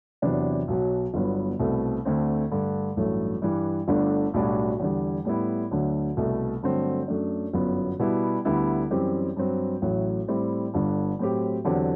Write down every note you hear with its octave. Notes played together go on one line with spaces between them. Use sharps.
E2 C3 F#3 B3 D4
B1 B2 F#3
G1 G2 F#3 B3
C2 B2 A3 C4
D2 D3 A3 C4
G2 D3 A3
A1 G2 F#3 A3
G2 E3 G3
G1 G2 D3 A3 D4
B1 A2 G3 D4 F#4
E2 D3 G3
A2 G3 B3 E4
D2 D3 F#3
C2 B2 A3
G2 D3 F#3 A3 C4
F#2 F#3 A3 D4
G1 F#2 F#3 B3
B2 G3 B3 E4 G4
D2 D3 G3 B3 E4
F#2 E3 G3 C4 G4
G2 F#3 C4
A1 A2 F#3
A2 G3 C4 E4
G1 G2 D3
A2 F#3 C4 G4
E2 D3 F#3 C4 G4